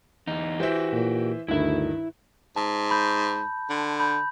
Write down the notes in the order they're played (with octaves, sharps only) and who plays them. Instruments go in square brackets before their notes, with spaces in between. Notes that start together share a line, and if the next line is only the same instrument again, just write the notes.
[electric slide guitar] E2 D#4
[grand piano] E3 C5 E5 [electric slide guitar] F#4 G4
[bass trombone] A#2
[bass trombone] D2 [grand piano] G2 D#3 [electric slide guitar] E4 E5
[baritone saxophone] G#2 [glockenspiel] A5
[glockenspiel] B5 G6
[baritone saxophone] D3
[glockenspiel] B5 G6